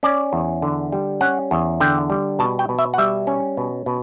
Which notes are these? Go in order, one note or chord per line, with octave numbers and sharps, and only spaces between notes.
C#4 D5
E2
D3
G3
C#4 F#5
E2
D3 G5
G3
B2 A5
G5
B2
E5
F#5
G3 E5
C#4
B2
B2